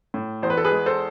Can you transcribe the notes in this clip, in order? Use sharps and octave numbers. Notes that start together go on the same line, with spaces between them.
A2
E2 C5
B4
A4
G#4 B4
G#3
A4 C5